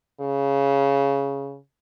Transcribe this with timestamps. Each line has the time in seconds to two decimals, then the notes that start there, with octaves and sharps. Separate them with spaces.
0.20 C#3